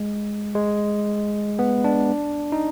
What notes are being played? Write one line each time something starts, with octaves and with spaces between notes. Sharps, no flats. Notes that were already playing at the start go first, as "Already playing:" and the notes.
Already playing: G#3
G#3
B3
D4
D#4